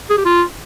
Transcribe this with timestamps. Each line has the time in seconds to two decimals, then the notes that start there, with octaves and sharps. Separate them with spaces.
0.10 G#4
0.17 G4
0.25 F4